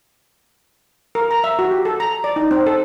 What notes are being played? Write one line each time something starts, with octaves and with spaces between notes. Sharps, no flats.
A#4
A#5
E5
F#4
G4
A4
A#5
D5
D#4
C4
A4